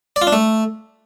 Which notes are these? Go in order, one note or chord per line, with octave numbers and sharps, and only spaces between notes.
D5
F4
D4
A3